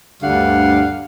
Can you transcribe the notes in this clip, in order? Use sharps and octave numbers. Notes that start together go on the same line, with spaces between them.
D2 G2 D3 G3 F5 F#5